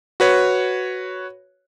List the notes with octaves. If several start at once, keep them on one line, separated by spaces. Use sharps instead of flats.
F#4 B4 C#5